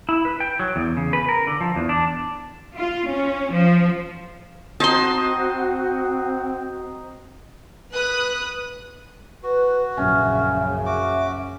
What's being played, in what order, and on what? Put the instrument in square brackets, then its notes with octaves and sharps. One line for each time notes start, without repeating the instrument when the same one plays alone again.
[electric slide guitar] E4
B4
G5
F#3
E2
C#3
B4
A#4
D3
F3
E2
D4
[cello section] F4
C#4
F3
[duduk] C4 [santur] D#4 C5 D#5 [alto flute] F#4 [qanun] A5 C6
[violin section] B4 D#6 F#6
[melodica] F#4 [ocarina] B4
[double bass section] A#1 F#2 C#3 [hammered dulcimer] C#4 [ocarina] E5
[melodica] F#4 D6 [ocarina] E5